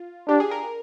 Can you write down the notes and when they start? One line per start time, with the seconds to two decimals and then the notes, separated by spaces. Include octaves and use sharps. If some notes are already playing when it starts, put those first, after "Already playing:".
Already playing: F4
0.28 D4 G4
0.40 G#4
0.51 A#4